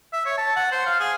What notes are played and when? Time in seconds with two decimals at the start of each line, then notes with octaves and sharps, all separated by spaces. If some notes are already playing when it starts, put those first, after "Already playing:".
0.13 E5
0.26 C#5
0.38 A5
0.56 F#5
0.72 C5
0.86 F5
1.00 G#4